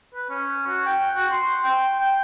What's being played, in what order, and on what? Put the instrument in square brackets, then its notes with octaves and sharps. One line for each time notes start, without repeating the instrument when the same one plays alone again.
[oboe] B4
C#4
F#4
G5
F#4
C6
G5
G5